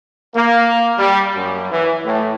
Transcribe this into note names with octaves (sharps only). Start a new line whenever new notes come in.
A#3
G3
F#2
E3
A2